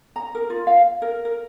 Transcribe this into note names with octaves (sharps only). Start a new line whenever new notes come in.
A#5
A#4
F4
F5
A#4
A#4